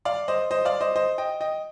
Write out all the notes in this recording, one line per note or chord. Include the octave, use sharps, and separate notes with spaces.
D5 F5
C5 D#5
C5 D#5
D5 F5
C5 D#5
C5 D#5
D#5 G5
D#5 G5